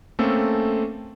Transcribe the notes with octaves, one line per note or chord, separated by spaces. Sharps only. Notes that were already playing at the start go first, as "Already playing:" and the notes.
A3 A#3 C4 C#4 A4